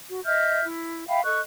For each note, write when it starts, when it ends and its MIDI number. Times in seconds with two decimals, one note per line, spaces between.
0.10 0.19 66
0.26 0.64 75
0.26 0.64 76
0.26 0.64 89
0.26 0.64 91
0.64 1.04 64
1.08 1.23 76
1.08 1.23 77
1.08 1.23 79
1.08 1.23 83
1.24 1.41 69
1.24 1.41 75
1.24 1.41 85
1.24 1.41 90